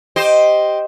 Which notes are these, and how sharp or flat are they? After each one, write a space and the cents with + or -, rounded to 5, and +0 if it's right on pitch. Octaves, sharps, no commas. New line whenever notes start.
G4 +0 C5 +0 D#5 +0